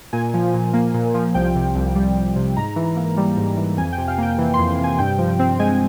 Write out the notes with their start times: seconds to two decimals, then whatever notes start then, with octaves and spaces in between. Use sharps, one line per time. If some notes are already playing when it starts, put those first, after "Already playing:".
0.13 A#2 G#5
0.34 F3
0.54 A#2
0.73 A#3
0.94 A#2
1.14 F3
1.34 C2 G5
1.55 C3
1.75 C2
1.95 G3
2.16 C2
2.36 C3
2.56 G#2 A#5
2.76 E3
2.96 A#3
3.17 G3
3.37 G#2
3.57 E3
3.77 F2 G#5
3.92 G5
3.98 C3
4.08 F5
4.18 A#3 G5
4.38 E3
4.54 F2 C6
4.79 C3
4.84 G#5
4.98 G2 G5
5.18 F3
5.39 C4
5.59 G#3 G#5